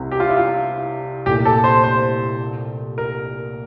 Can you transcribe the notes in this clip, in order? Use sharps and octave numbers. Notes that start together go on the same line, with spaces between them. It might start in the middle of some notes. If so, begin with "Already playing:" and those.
Already playing: C2 C3
G4
F4
E4
F4
C2 A#2 A3 G4
A4
C5
C5
A#4